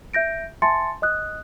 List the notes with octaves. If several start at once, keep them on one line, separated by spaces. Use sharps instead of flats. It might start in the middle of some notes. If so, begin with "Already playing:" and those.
E5 G6 A#6 D7
E5 G#5 A5 C6 A6 C#7
D#5 D#6 F#6